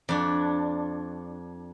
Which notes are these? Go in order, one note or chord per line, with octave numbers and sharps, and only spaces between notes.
F2 D4